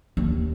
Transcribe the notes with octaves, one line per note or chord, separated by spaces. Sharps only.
D#2